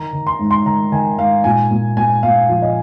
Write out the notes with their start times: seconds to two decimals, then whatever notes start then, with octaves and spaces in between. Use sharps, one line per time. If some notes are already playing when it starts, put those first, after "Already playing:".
Already playing: D#3 A#5
0.13 D#3
0.27 C6
0.39 G#2
0.51 C6
0.65 D#3 A#5
0.92 D#3 G#5
1.18 G#2 F5
1.44 A#2 G#5
1.71 A#2
1.97 A#2 G#5
2.23 A#2 F5
2.49 F3
2.62 D#5